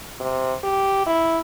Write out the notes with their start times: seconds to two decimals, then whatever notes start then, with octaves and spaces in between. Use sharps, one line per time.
0.20 C3
0.64 G4
1.06 E4